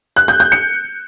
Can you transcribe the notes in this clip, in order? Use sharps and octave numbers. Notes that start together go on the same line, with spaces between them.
F#6
G6
G6
C#7